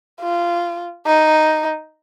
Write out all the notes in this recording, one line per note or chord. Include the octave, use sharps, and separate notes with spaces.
F4
D#4